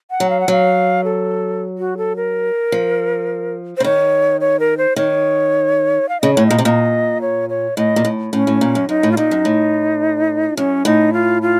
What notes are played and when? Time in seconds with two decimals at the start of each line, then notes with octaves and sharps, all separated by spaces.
0.11 F#5
0.20 F#3
0.30 F5
0.40 F#5
0.48 F#3 F5
1.04 A4
1.78 F#4
1.97 A4
2.16 A#4
2.72 F3
3.77 C5
3.80 C#3
3.84 D#3 C#5
4.41 C#5
4.60 A#4
4.78 C5
4.96 D#3 C#5
6.09 F5
6.21 C#3 D#5
6.34 A2 C#5
6.47 A#2 D#5
6.58 C3
6.64 A#2 D#5
7.21 C#5
7.50 C#5
7.77 A2 D#5
7.96 A#2
8.05 A2
8.33 A2 C#4
8.47 A2
8.61 A#2
8.75 F#2
8.89 F#2 D#4
9.03 A2
9.12 F4
9.17 A#2 D#4
9.31 F#2
9.45 A2
10.57 F#2 C#4
10.85 A2 D#4
11.13 F4
11.42 F4